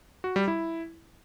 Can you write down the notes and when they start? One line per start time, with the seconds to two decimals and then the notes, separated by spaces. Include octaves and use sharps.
0.24 F#4
0.36 G3
0.48 E4